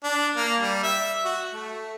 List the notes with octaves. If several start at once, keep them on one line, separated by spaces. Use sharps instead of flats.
D4
A#3
G3
E5
F#4
A3